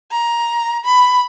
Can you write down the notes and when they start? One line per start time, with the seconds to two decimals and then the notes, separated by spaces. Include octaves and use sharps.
0.11 A#5
0.85 B5